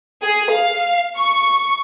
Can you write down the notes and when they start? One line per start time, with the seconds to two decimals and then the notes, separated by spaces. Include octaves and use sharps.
0.23 G#4
0.52 F5
1.16 C#6